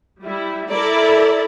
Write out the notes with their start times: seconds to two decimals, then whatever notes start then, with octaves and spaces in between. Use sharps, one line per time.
0.23 G3 E4
0.71 E4 A4 A#4 D5